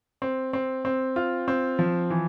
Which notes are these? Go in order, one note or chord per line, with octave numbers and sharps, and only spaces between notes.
C4
C4
C4
F4
C4
F3
E3